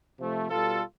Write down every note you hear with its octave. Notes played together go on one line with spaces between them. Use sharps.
C3 F3 A3
B2 G3 F4 A4